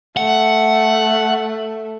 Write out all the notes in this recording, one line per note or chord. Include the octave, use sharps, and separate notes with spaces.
A3 F#5